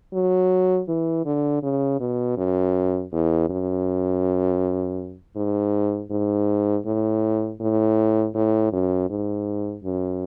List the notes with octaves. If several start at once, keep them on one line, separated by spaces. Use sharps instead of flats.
F#3
E3
D3
C#3
B2
F#2
E2
F#2
G#2
G#2
A2
A2
A2
F#2
G#2
F#2